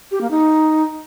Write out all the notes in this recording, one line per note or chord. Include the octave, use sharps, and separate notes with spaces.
G4
A#3
D#4